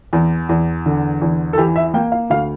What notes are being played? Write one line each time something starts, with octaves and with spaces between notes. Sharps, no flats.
E2
E2
D3
E2
A4
E3 G4
E5
A#3 G5
F5
D2 F5